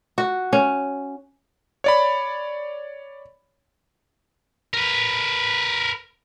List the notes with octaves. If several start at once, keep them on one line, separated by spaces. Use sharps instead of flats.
F#4
C#4
C#5 D5 B5
A#4 B4